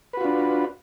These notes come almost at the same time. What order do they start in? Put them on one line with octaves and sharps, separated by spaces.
B4 F#4 F4 D4